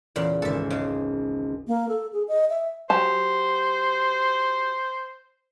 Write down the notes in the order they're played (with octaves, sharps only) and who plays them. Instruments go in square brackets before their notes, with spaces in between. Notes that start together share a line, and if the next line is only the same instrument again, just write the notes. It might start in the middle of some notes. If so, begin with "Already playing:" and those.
[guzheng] E2 A#2 C#3
[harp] G#1 C#2 [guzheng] A4 E5
[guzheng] C#3 G#3
[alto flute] A#3
A4
G#4
D#5
E5
[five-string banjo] F#3 G4 A5 [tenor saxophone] C5